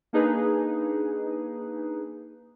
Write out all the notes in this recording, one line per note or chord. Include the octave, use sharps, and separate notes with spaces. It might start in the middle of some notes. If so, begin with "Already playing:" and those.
A#3 D4 D#4 G#4 B4